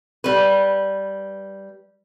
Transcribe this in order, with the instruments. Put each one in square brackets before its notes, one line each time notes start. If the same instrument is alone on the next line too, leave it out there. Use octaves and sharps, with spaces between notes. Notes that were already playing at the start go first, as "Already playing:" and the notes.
[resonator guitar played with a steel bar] G3 B4